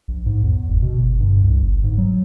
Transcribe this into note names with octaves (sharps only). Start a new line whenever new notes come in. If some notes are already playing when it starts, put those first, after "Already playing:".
A#1
G#2
E2
G1
B2
G1
G2
C2
G1
G#2
F#3